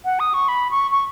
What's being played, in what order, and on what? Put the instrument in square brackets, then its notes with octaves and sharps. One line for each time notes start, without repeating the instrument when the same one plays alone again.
[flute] F#5
D#6
C#6
B5
C#6
C#6